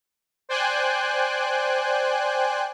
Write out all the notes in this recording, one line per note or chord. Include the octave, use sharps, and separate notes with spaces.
C5 D5 G5 G#5 F#6